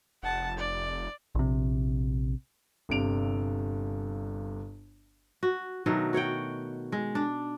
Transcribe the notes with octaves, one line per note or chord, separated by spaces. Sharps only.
F1 F#5 A5
D5
A#1 C3
G1 G2 C3 D7 F7
F#4
B2 D#3 F#3 A3
F#4 C#5 F#5 G5
G#3
D4